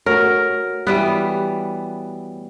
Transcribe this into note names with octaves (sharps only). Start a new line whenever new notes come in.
A3 F#4 A#4 C#5
E3 G3 B3